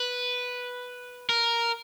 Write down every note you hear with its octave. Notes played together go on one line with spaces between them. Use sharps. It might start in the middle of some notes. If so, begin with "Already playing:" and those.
Already playing: B4
A#4